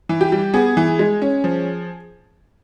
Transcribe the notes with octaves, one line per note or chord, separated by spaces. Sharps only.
E3
G4
G3
B3 G#4
E3
G#3
C#4
F3